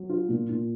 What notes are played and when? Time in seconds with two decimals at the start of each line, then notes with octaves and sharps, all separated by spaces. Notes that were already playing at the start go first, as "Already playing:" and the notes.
Already playing: F#3
0.09 F4
0.29 A#2
0.49 A#2